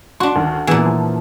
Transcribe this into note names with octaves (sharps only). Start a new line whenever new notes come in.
D4 F#4 C6
D2 D#3
A#2 E3 B3 G#4
F3